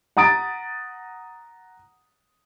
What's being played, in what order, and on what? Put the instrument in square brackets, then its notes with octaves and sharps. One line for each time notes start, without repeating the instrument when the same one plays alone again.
[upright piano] F#5 A#5 D#6 A6 D7